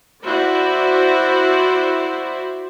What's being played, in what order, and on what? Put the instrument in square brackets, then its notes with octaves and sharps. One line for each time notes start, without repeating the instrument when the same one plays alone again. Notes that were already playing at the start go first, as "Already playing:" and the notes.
[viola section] E4 F#4 C5 D5